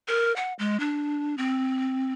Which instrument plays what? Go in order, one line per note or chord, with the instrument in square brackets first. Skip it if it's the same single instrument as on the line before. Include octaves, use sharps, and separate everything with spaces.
[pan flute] A#4
F#5
G#3
D4
C4